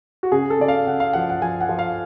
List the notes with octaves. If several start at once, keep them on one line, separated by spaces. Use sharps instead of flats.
F#4
C#3 G#4
A4
C#3 D5
F5
C#3 F#5
F5
F3 F#5
F#5
F3 G#5
F#5
F3
F5